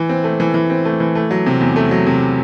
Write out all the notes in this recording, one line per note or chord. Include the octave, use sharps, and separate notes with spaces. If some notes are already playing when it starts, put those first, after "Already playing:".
Already playing: E3
C4
A3
E3
E3
C4
A3
E3
A3
F#3
C3
E2
A3
F#3
C3